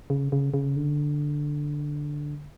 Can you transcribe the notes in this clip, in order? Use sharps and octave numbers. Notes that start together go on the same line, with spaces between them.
C#3
C#3
C#3
D3